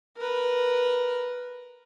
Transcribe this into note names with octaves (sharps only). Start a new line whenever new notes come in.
A#4 B4